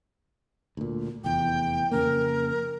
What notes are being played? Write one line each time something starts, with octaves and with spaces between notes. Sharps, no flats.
D2 A#2
F1 E2 G5
F2 C#3 A#3 A#4